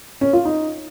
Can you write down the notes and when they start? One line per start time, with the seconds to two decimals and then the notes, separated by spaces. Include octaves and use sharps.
0.21 C#4
0.33 F4
0.45 D#4